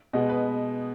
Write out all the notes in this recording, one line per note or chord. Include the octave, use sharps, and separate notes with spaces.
B2 G#3 B3 D#5
B4